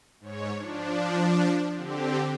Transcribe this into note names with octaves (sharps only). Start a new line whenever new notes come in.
G#2 C#5
F3 D4
D3 C4 G4